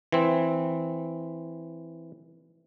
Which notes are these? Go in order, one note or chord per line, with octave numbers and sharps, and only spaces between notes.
E3 C4